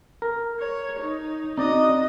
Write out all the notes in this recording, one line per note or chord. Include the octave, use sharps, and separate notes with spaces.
A#4
C#5
D#4
C4 D#4 F#4 D5 D#5